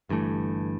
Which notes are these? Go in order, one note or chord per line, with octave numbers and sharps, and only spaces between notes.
G1 G2 E3 A3